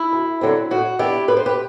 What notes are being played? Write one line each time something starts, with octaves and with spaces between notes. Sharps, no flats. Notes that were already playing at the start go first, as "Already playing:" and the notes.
Already playing: E4
D2
D3 F#3 A3 C4
A2 F#4
E3 B3 D4 E4 G4
A2 B4
C5
G4 B4